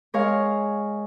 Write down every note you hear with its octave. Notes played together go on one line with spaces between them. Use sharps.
G#3 A#4 C#5 F5